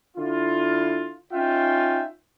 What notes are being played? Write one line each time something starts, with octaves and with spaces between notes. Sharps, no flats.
D3 E4 F4
C#4 D#4 F4 E5 G5